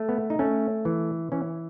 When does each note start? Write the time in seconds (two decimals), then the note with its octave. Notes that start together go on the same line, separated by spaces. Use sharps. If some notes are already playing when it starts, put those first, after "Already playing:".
Already playing: A3
0.09 B3
0.30 D#4
0.39 A3 C#4
0.85 E3
1.32 E3 C#4